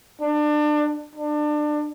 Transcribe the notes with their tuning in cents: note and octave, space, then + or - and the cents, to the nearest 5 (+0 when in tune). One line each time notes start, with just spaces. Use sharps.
D4 +30
D4 +25